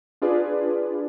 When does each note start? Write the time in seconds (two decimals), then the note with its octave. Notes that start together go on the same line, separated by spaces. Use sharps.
0.22 D4 F4 G#4 B4 D5